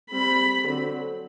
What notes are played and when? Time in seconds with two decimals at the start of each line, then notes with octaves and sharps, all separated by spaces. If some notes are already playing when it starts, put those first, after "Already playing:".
0.13 G3 C4 B5
0.65 D3 F#3 C4